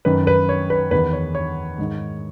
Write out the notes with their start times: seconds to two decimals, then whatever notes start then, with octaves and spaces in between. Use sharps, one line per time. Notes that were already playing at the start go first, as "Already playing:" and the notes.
0.05 F#2 D#3 B4
0.27 B4
0.49 C#5
0.70 B4
0.91 E2 D#3 B4
1.13 C#5
1.35 C#5
1.78 G#2 D#3